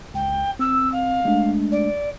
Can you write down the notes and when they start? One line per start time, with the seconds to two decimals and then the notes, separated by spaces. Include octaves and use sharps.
0.14 C#2 G5
0.59 C4 E6
0.92 F5
1.25 G#3 A3 D4
1.71 D5